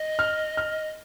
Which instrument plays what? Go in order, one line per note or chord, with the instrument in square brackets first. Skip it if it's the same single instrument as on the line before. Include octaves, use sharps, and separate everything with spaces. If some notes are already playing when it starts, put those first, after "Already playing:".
Already playing: [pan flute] D#5
[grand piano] F6
F6